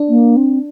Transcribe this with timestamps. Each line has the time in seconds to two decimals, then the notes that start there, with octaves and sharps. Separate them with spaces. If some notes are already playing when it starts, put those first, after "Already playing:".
Already playing: D4
0.09 A#3
0.36 C4